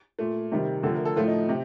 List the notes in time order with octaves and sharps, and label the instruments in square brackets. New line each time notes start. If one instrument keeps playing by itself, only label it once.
[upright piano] A#2 A3
C3 D#3 G3
D3 F3 A3 A4
A#4
A4
A2 F3 A3 F4
D#4
C3